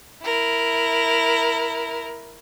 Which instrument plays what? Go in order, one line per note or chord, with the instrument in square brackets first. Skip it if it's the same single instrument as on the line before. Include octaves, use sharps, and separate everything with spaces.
[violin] E4 A#4